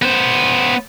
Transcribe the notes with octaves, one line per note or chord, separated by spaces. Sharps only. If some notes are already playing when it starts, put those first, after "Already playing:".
B3 C5